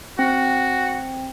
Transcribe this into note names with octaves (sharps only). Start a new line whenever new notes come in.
C4 F#4